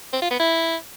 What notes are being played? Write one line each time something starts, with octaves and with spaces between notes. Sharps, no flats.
C4
F4
B3
E4